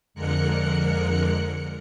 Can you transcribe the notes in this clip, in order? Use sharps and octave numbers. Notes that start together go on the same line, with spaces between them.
F2 D3 G#3 A#4 F#6 C#7